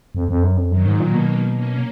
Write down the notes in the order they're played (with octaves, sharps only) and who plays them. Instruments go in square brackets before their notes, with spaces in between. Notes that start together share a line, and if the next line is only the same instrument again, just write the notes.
[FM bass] F2
F2
F#2
F2
[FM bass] F#2 [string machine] D#3 F#3
[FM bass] G#2
[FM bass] A#2 [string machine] F#3 A#3
[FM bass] B2
[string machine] A#3 C#4
A#3 C#4